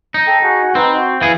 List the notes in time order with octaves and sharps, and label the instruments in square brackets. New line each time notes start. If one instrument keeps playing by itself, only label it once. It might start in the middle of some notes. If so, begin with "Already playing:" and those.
[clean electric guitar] D#4
[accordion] A4 G5
F#4 G#4 F#5
[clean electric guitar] C4 [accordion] D#4 B4
[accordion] F#4
[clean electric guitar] E3 G#4 [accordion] F5